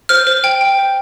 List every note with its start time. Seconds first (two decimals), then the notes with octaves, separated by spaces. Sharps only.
0.09 C5 F6
0.27 C5
0.44 G5
0.61 G5
0.78 C5